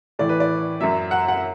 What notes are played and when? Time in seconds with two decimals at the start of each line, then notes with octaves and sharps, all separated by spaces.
0.19 A2 E3 D5
0.29 B4
0.40 D5
0.81 F#2 F#3 E5
1.11 F#5
1.28 F#5